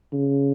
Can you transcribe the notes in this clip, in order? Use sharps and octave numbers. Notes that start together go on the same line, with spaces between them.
C#3